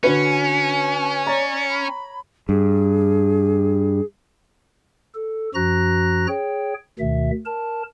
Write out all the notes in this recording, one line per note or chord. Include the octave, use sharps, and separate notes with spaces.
D3 C#4 F#4 B4
G#5
C#5 D5 A#5
B5
G2 G#4
A4
F#2 F3 F#4 A#5 F#6 A#6
G#4 C#5 G5
D2 B2 D#3 E5
A#4 A5